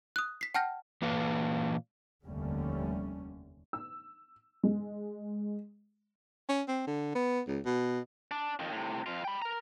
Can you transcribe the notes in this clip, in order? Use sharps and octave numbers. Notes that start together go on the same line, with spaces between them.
D#6 F#6
B6 C7
F#5 G5 A5 F6 G6 A#6
A#2 E3 A#3 B4 F5
F1 D#2 D3 G3 A3 C#4
E6
G#3
C#4
C4
D3
B3
C#2
B2
D4
F2 D#3
A2 C3
F2 F4
G5 B5
A#4 A#5